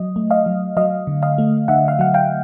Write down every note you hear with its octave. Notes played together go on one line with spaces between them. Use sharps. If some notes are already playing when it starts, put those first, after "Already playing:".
Already playing: F#3 D#5
A3
D#5 F5
F#3
F#3 D#5 F5
D3
D#5 F5
A3
D3 E5 F#5
F5
F#3 F#5
F5 G5